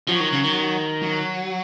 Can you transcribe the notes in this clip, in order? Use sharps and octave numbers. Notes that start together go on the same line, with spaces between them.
F3 F#3
D#3
C#3
D#3
F#3